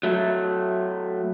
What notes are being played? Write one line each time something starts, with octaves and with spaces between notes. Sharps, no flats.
F#3 A3